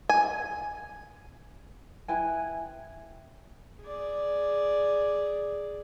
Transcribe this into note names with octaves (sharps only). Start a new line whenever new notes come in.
G#5
E4 B4 G5 G#5
G#4 D5